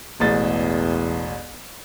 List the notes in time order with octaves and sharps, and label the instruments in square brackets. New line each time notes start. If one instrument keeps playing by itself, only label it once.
[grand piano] E1 A1 A6 [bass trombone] E2